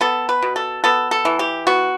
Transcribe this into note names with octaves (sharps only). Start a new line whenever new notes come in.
B3 A4
B4
B2
A4
B3 A4
A4
E3
G4
B3 F#4